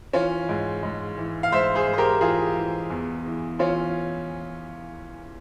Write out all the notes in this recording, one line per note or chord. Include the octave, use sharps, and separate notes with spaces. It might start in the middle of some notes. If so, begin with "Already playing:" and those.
E3 C#4 F4
G#2
G#2
E3
F5
G#2 C5 E5
G#4 C5
G#2
C5
G4 A#4
E3 F4 G#4
E3
E2
E3
E3 C#4 F4